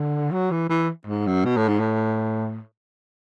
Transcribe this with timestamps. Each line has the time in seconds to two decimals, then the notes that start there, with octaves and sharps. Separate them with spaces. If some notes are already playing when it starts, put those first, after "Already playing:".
Already playing: D3
0.32 F#3
0.51 E3
0.70 E3
1.07 G#2
1.27 F#2
1.45 B2
1.57 A2
1.68 G#2
1.80 A2